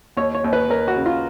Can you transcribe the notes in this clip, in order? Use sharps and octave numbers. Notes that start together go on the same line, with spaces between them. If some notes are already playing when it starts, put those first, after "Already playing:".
D#2 C#5
C#5
D#2
B4
D#2 A#4
F#4
C#3
F4